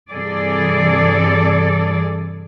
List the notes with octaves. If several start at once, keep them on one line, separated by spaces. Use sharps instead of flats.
G2 C3 E3 G#4 A4 D5